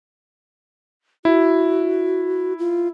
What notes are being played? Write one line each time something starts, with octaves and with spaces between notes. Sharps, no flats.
E4 F#4
F4